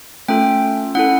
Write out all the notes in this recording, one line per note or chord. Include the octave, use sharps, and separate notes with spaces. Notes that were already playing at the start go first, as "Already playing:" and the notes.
A3 C#4 F4 A4 G5
C#4 E4 A4 F#5